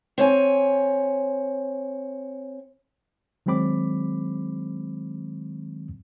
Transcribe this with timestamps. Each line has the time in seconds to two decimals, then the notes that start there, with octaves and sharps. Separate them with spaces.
0.18 C4 C#5 G#5
3.46 D#3 F#3 G#3 C4 B5 D6